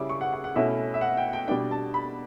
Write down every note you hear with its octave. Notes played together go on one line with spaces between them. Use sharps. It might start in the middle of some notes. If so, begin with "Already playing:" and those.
Already playing: C#3 G3 C#4 E4 D6
C#6
F#5
F#5
F#5
B2 A3 C#4 E4 E5
E5
F#5
G5
G5
B2 G3 D4 G5
A5
B5